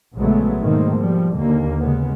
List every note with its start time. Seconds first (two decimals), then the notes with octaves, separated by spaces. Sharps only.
0.15 A#1 C#3 F#3 G#3 A3 B3
0.61 G#2 B2 D#3 A3 A#3 C4
0.98 F3 G3
1.34 D#2 D3 A#3
1.81 C#3 G#3 B3